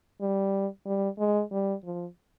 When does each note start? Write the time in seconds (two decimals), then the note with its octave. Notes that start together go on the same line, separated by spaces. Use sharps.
0.21 G3
0.86 G3
1.19 G#3
1.52 G3
1.84 F3